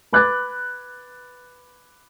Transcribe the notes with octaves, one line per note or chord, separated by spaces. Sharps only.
B4 B5 D6 F#6 G#6 A6